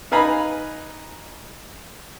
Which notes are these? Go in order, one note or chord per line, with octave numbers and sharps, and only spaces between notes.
D#4 B4 F5 G#5 A#5 B5